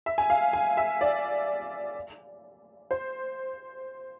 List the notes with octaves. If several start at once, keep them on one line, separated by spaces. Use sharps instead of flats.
E5
G#5
F5
G#5
E5
D5
C5